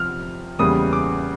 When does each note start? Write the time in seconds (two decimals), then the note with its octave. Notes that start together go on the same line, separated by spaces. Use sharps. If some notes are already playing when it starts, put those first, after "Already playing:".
Already playing: C3 F3 F6
0.59 E2 C#3 E3 G3 A#3 D#6
0.93 D6